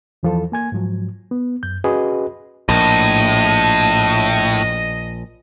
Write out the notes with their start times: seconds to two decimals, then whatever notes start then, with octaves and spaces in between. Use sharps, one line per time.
0.23 E2 E3 F3 F4 A4
0.52 A#3 G#5 G#6
0.72 G#2 F3 F#3
1.31 B3
1.63 F#2 G6
1.84 C#4 F#4 G#4 B4 D#5
2.69 A#1 A2 D#5